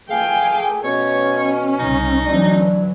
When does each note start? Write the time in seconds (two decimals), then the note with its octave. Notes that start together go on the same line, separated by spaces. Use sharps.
0.11 A3 G#4 F5 G5 G#5
0.84 B2 C#4 C#5
1.79 C2 C#3 D#4
2.26 D2 E3 F#3 D4